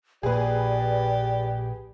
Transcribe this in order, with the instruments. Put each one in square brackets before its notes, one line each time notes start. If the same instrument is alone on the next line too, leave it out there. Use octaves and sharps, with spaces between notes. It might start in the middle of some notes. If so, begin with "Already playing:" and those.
[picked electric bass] A#1 A#2 [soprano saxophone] G4 [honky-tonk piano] G#4 B4 [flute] D5